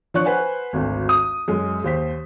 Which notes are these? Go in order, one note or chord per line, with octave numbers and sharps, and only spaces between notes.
F3 D4 C#5 C#6 F#6
B4 C5 F#5 G#5
G#1 D2
D#6
F#2 G#3
D#2 C5 B6